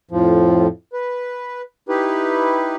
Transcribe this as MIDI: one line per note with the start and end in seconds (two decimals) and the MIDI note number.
0.11 0.67 41
0.11 0.67 45
0.11 0.67 53
0.93 1.61 71
1.89 2.76 63
1.89 2.76 64
1.89 2.76 67
1.89 2.76 71